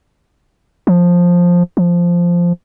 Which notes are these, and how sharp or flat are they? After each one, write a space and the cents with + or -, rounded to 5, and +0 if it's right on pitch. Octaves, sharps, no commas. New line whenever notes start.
F3 +10
F3 -5